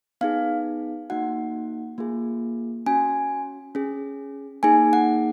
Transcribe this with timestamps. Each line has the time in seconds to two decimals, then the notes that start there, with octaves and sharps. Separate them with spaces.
0.21 B3 D#4 G#4 F5
1.10 A#3 D#4 F#4 F#5
1.98 A#3 F4 G#4
2.86 C#4 F#4 G#5
3.75 C#4 G#4
4.63 A#3 D#4 G#4 G#5
4.93 F#5